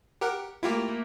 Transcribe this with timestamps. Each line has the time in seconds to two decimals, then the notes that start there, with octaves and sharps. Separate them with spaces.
0.21 G4 A#4 F#5
0.63 A3 A#3 E4 F4 G4